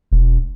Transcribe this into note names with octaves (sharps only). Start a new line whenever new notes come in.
E1